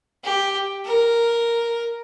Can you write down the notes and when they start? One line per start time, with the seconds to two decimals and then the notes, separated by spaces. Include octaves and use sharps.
0.24 G4
0.85 A#4